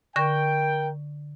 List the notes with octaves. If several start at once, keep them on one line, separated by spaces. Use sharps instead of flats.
D3 A#4 G5 C#6 A#6